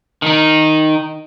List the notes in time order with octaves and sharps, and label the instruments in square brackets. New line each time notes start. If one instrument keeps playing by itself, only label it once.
[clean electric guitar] D#3 D#4